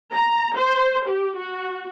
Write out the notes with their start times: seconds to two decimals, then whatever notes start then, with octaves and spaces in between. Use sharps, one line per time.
0.12 A#5
0.57 C5
1.07 G4
1.37 F#4